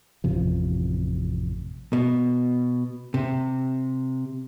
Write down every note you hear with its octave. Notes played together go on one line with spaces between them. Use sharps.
A1 F2 C3 F3
B2
C3